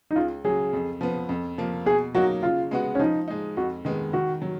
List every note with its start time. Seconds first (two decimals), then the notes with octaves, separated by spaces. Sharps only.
0.11 D#4
0.16 C#2 F4
0.45 C#3 F#3 G#4
0.73 F2
1.01 F3 B3
1.29 F2
1.58 F3 A#3
1.86 B2 G#4
2.15 F#3 A#3 D#4 F#4
2.43 C#3 F4
2.71 G#3 B3 F#4
2.95 C#4
2.99 F3 D#4
3.28 G#3 D#4
3.57 F2 F#4
3.85 D#3 G#3 B3
4.13 D#3 F#4
4.42 F#3